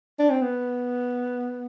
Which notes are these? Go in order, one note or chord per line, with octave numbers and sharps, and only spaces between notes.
D4
C4
B3